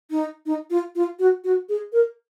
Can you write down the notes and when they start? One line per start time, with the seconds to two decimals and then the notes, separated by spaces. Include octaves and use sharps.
0.10 D#4
0.46 D#4
0.70 F4
0.95 F4
1.19 F#4
1.44 F#4
1.69 G#4
1.93 A#4